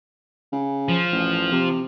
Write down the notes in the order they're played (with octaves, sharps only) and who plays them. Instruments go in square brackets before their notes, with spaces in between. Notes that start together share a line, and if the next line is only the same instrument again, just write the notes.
[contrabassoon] C#3
[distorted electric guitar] F3
[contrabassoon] A1
C3